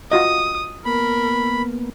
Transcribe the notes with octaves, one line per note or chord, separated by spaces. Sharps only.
F4 F#4 D#5 D#6
A#3 B3 A#4 B5